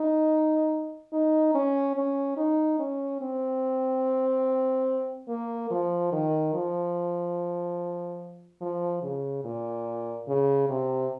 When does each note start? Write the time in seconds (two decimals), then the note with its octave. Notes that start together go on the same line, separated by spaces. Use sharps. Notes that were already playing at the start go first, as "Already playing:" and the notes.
Already playing: D#4
1.13 D#4
1.55 C#4
1.96 C#4
2.37 D#4
2.79 C#4
3.22 C4
5.28 A#3
5.71 F3
6.12 D#3
6.54 F3
8.61 F3
9.03 C#3
9.45 A#2
10.28 C#3
10.69 C3